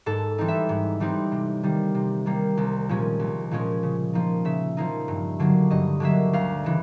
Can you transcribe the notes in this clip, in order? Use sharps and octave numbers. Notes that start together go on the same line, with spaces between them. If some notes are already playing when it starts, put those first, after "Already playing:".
G#2 A4
E3 G3 C4 D#4
E5
G#2
E3 G3 C4 D#4
C3
D#3 G3 A#3
C3
D#3 G3 A#3
C2
A#2 F3 G#3 C#4
C2
A#2 F3 G#3 C#4
C#3
F3 A#3 D#4
C#3 E5
F3 A#3 D#4
G2
D3 F#3 A#3
G2 D#5
D3 F#3 A#3 E5
D2 F5
C#3 E3